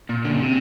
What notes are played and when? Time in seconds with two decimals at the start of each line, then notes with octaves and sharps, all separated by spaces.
0.09 A#2
0.25 D3
0.33 C#3
0.42 C3